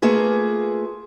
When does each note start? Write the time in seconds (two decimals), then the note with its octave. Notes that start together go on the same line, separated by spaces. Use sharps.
0.02 A3 A#3 F4 G#4 B4